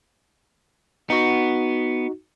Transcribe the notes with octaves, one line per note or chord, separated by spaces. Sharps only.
B3 D#4 F#4